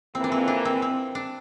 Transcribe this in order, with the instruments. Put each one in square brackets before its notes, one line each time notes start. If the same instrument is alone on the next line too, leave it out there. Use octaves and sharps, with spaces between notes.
[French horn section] F2 E3 A#3 [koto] C4
[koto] D4
C4
D4
C4
C4
D4